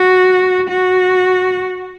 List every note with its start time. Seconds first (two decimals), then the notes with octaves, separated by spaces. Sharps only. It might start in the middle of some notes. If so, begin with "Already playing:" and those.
Already playing: F#4
0.70 F#4